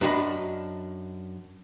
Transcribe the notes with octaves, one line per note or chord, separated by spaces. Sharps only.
F#2 D4 F#4 D#5 B5